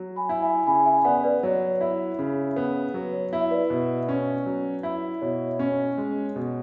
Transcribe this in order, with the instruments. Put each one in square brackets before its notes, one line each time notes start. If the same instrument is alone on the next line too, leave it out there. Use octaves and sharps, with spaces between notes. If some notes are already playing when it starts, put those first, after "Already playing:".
Already playing: [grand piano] F#3
[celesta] G#5 B5
[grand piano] E4
[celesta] E5 G#5
[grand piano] C#3 [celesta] G#5 B5
[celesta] E5 G#5
[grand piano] B3 [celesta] D5 F#5
[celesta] B4 D5
[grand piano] F#3 [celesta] C#5
[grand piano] E4
C#3
B3
[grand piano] F#3 [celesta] B4
[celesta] C#5
[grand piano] E4
[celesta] E5
B4 D5
[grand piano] B2
C#4
F#3
E4
[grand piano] B2 [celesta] C#5
[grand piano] C#4
G#3
B2